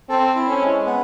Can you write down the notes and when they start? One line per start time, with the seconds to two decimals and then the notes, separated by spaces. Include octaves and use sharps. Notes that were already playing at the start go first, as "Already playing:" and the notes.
0.09 C4 A4
0.35 E4
0.48 C#4
0.61 G#3
0.86 B3